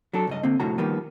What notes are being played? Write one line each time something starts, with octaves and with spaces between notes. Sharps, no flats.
F#3 D4 A4
C#2 G2 D#5
D3 A#3 C4
C2 F2 A2 D3 F#4 A#5
D#3 F3 G3 A#3 B3